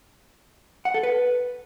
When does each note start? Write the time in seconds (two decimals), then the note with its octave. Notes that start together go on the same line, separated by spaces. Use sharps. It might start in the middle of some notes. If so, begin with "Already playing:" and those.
0.85 F#5
0.94 A4
1.03 B4